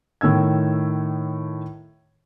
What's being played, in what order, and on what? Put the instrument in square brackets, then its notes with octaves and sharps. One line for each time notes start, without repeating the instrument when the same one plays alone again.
[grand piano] A2 D#3 E6 G#6